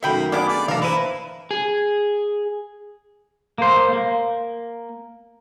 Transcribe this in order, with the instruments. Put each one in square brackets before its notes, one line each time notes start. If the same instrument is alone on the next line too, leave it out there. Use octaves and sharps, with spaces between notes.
[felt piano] F#2 D#3 A3 [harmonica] A#3 [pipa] E5 G5 B5
[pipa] A#3 G#4 [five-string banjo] B3 D4 B5 [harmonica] D6
[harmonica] D5
[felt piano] E3 A#6 [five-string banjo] A4 F5 [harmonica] A#4
[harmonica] E4 [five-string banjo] B4 [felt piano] C5 D#7
[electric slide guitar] G#4
[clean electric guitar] A#3 C5
A#3